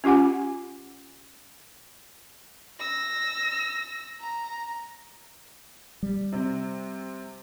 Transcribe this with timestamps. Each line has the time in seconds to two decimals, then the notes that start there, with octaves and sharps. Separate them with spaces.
0.04 C#4 F4 G4 F#5 G#5
2.79 E6 A#6
4.20 A#5
6.03 G3
6.32 C3 C4